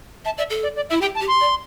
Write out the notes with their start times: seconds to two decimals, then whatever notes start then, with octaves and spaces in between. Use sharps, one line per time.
0.25 E5 A5
0.38 D5 E5
0.50 A4
0.63 D5
0.76 D5
0.89 E4 E5
1.01 G4 G5
1.15 A5
1.21 G4
1.28 C6
1.40 D5